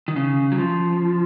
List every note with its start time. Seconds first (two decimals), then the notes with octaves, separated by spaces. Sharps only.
0.08 D#3
0.16 C#3
0.52 F#3
0.58 F3